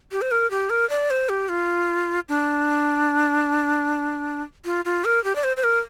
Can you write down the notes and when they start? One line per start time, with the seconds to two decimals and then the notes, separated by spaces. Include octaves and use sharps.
0.12 G4
0.22 C5
0.31 A#4
0.51 G4
0.70 A#4
0.90 D5
1.10 C5
1.29 G4
1.49 F4
2.29 D4
4.65 F4
4.85 F4
5.05 A#4
5.24 G4
5.36 D5
5.44 C5
5.57 C5
5.64 A#4